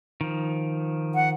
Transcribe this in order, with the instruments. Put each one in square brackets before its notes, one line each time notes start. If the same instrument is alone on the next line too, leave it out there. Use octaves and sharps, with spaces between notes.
[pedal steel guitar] D#3 F3
[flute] F#5